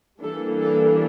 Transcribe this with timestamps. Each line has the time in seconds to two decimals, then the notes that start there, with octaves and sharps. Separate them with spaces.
0.22 E3 G3 A#3 D4 A4
0.62 A4